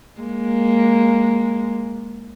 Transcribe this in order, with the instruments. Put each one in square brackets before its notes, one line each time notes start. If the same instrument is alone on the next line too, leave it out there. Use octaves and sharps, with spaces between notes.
[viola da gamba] G#3 A#3